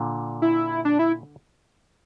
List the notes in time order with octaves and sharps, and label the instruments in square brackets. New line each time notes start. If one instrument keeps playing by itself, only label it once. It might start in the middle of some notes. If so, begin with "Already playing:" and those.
Already playing: [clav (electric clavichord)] A#2 D3
[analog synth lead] E4
D4
E4